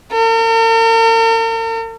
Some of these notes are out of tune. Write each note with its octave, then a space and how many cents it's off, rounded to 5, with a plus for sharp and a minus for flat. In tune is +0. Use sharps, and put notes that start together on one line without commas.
A#4 -45